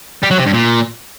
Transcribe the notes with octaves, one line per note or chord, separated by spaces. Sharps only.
G3
F#3
C3
G2
A#2